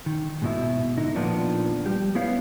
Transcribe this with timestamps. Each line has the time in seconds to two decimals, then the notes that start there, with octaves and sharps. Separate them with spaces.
0.06 D#3
0.42 G#2 B2 E4
0.98 D3 D#4 E4
1.15 A#2 D#3 F3 B3 D4
1.86 G3 G4
2.15 B3 E4 B4 C#5 F5